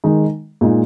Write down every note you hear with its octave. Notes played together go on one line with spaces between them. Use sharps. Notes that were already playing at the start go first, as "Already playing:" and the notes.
D#3 G#3 D#4
A#2 G#3 D#4